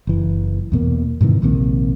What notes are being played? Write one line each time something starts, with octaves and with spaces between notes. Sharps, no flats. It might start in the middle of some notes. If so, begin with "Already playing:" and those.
F#1 E3
E2 B2 A#3
G#2 C3 D#3 E3
A#1 D#2 C3 A#3